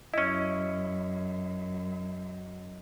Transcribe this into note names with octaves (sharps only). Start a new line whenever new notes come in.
F#2 C#4 E4 D#5